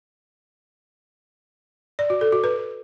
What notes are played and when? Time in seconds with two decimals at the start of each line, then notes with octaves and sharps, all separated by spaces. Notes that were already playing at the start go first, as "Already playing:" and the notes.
1.99 D5
2.10 F#4
2.21 A4
2.32 F#4
2.44 B4